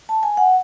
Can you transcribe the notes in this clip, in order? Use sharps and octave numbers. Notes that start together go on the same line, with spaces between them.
A5
G#5
F#5